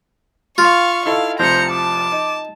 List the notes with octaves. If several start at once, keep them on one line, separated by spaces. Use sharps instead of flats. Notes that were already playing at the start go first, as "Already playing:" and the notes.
F4 F5 C#6
D#4 E4 A4 F5
F1 C2 F3 C5 A#5 C#7
A5 D6
D#4